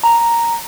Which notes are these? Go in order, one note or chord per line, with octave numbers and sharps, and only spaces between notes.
A#5